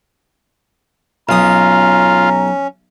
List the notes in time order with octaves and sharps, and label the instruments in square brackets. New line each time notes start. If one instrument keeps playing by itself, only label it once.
[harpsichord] B1 D#6 [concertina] C#4 [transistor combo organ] F4 [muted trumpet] A#5